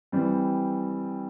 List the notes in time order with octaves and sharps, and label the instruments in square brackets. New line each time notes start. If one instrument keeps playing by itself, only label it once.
[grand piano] E3 G3 C4